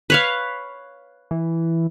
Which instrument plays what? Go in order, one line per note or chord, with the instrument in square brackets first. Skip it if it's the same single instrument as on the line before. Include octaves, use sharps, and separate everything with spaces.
[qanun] B4 C#5 F5
[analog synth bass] E3